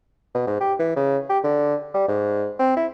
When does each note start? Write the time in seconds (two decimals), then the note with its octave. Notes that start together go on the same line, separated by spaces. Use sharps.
0.35 B2
0.47 G#2
0.60 G4
0.79 E3
0.96 C#3
1.30 G4
1.44 D3
1.94 G3
2.08 G#2
2.59 C4
2.77 E4